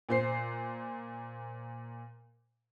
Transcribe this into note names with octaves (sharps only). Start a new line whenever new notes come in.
A#2 C5 C7